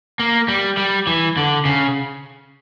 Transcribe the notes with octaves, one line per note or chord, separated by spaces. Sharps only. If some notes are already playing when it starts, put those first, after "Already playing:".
A#3
G3
G3
E3
D3
C#3